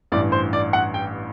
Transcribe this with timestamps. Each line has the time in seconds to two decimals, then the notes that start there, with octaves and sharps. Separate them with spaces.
0.12 A1 G2 E3 D5
0.32 C5
0.53 D5
0.73 F#5
0.94 G5